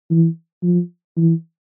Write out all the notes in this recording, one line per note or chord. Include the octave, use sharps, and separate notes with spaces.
E3
F3
E3